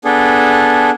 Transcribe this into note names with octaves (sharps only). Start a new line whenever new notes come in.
B3 D4 G#4 A4